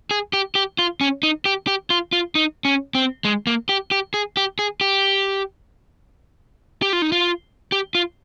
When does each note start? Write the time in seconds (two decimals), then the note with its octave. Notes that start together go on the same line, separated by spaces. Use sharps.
0.11 G#4
0.33 G4
0.55 G4
0.79 F4
1.01 C#4
1.23 D#4
1.45 G4
1.67 G4
1.90 F4
2.13 F4
2.35 D#4
2.65 C#4
2.95 C4
3.25 G#3
3.47 A#3
3.69 G4
3.91 G4
4.14 G#4
4.37 G4
4.59 G#4
4.81 G4
6.82 G4
6.93 F4
7.02 D#4
7.12 F4
7.72 G4
7.95 F4